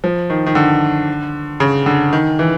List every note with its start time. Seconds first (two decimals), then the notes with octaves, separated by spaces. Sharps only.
0.04 F3
0.30 D#3
0.47 D#3
0.55 D3
1.60 C#3
1.86 D3
2.13 D#3
2.39 E3